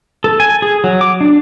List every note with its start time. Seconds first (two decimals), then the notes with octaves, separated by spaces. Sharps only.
0.24 A4
0.40 G#5
0.62 G#4
0.84 F#3
1.01 D6
1.21 D4